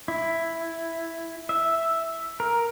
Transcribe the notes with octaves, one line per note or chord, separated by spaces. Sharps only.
E4
E5
A#4